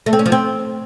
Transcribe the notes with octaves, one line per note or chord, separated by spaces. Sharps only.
A3
C4
C#4
F3
C4